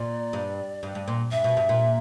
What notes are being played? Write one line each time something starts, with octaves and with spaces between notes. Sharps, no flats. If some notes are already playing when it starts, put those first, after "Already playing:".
Already playing: A#2 D5
G2
G2
G2
A#2
G2 E5
B2
G2
A#2